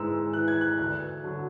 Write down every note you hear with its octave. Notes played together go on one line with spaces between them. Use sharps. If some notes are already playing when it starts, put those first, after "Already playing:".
Already playing: G#2 E3 E6
E3 F#6
G#6
F#6
D2 F#6
D3 F#3